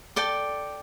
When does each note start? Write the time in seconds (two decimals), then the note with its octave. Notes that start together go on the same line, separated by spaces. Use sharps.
0.16 A4 D5 G5